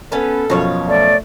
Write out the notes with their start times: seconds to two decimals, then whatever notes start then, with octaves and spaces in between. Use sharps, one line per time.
0.12 B3 C#4 A4 B4
0.50 F#2 B2 F3 C#5 F5
0.89 A3 D5